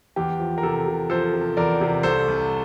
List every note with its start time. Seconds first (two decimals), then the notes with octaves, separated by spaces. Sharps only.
0.16 E2 G4
0.39 F3
0.58 A#4
0.63 C3 A4
0.87 C3
1.10 F3 A4 C5
1.34 C3
1.57 E2 A#4 D5
1.81 C3
2.03 C2 A4 C5
2.28 C2